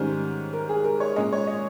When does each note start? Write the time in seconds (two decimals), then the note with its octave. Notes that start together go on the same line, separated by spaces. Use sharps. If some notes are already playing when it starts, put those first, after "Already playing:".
Already playing: G#2 D#3 G3 C#4 C5
0.53 A#4
0.69 G#4
0.84 A#4
1.00 C#5
1.16 A#2 G#3 C#4 D#5
1.33 C#5
1.47 D#5